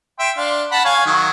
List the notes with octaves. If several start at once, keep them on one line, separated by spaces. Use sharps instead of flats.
E5 G5 C6
D4 F5 C6
F#5 A5 B5
C#5 F5 G#5
D#3 F#3